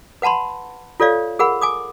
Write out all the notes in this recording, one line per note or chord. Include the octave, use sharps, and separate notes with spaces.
B4 F#5 A5 B5 C6
F4 A4 C#5 D5 F5
G#4 A#4 F#5 B5
G#5 D6 D#6